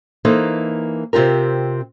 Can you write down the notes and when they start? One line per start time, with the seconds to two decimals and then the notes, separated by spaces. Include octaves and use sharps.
0.25 E3 A#3 D#4 A4 C5
1.13 C3 C4 F4 G4 A#4